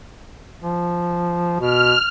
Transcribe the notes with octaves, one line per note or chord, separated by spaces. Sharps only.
F3
B2 F6